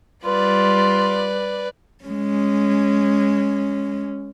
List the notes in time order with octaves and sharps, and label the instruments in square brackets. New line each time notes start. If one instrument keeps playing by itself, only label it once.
[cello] G3 [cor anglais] F4 [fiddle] B4 D5
[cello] G#3 C#4